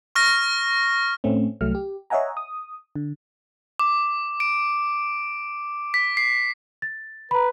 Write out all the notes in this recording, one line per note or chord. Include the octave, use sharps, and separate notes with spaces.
C#6 F6 A#6
A2 A3 C4 C#4
C2 F#3 A3 F6
G4
C#5 D#5 E5 F#5 G#5 A#5
D#6
D3
D6
D7
B6
C7
A6
B4 A#5 B5